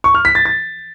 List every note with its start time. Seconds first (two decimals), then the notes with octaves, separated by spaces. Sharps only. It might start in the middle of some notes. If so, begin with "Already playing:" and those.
0.04 C#6
0.15 F6
0.25 B6
0.35 A6
0.45 A6